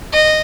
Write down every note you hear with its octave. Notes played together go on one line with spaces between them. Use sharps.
D#5